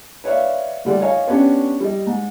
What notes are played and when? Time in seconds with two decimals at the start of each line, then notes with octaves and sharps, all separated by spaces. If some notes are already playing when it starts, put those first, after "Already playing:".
0.24 B4 C#5 D5 E5 F5
0.85 D2 G3 D5
1.01 C#5 D#5 F5 G#5
1.27 B3 C#4 D4 G4 C#5
1.80 G3 D#5
2.07 G#2